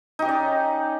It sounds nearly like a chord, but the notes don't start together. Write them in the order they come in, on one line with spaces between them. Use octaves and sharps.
D#4 G4 C#4 D5